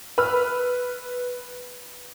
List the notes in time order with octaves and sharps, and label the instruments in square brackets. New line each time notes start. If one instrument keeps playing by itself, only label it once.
[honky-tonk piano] B4 B5 E6 F6